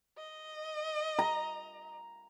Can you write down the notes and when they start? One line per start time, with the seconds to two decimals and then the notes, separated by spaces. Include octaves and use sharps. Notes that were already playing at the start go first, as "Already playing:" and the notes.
0.18 D#5
1.19 A#5